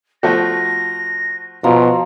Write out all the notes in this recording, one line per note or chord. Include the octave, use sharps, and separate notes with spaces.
F3 A3 F#4 A#6
B2 F3 A#5 C6